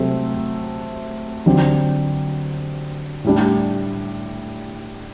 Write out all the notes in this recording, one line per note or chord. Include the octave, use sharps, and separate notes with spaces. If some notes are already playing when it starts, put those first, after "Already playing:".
Already playing: C3 F#3 A3 C4
D3 F#3 C4 G4
A2 G3 D4